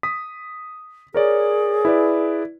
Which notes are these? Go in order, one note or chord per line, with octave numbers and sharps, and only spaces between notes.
D#6 B6
G#4 A#4 C#5 D5
E4 B4 D5